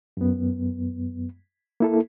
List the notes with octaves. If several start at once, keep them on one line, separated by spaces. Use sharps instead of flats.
F#2 B3
A#3 E4 A4